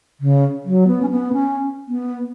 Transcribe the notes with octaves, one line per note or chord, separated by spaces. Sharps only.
C#3
F#3
B3
C#4
B3
C#4
B3